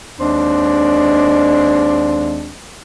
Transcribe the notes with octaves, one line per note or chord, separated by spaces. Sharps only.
D#2 G#3 C4 D4